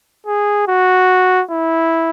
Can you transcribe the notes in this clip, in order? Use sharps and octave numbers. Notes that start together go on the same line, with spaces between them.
G#4
F#4
E4